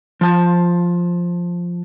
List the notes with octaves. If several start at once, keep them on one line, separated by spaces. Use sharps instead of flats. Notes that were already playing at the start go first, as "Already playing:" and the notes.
F3 A5